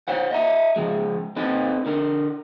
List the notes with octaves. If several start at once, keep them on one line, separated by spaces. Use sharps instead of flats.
C5 C#5 F#5
D#5 E5 A#5
C#3 F3 G#3
C4 D#4 A4 B4
D3 A#4